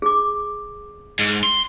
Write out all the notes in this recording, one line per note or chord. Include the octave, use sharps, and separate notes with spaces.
G#4 D6
G#2
C6